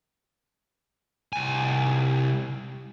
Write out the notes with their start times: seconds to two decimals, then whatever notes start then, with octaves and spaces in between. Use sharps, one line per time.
1.33 C2 G#5